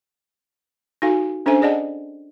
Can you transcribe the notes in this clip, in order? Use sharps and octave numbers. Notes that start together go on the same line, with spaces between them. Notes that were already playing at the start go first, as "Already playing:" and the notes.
D#4 F#4 A4 F5 G#5
C#4 D4 A4 C5 E5 G#5
G#4 D5 D#5 F#5 A5